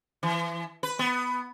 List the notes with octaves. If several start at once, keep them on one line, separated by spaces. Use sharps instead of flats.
E3
B4
B3